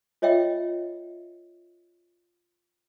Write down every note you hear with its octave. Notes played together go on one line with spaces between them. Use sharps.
F4 C#5 D#5 E5 G5